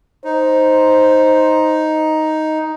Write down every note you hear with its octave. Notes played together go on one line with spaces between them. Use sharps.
D#4 C5